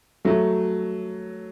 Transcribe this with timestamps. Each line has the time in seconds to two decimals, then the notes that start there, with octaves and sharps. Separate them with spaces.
0.25 F#3 A3